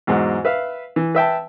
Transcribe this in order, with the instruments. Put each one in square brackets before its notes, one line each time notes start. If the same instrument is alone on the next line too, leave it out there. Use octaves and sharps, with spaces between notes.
[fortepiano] E2 G#2 F#3 G#3 F#5
B4 E5 F5
E3
B4 E5 G5 A5